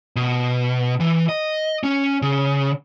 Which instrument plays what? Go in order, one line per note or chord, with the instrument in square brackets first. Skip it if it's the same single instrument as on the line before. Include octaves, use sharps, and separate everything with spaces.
[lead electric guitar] B2
E3
D#5
C#4
C#3